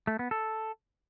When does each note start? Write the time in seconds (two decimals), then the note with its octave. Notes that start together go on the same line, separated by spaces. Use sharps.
0.07 A3
0.19 B3
0.31 A4